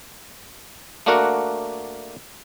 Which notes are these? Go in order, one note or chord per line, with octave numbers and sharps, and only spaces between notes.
A3 A#3 D4 F#4 A#4 F#5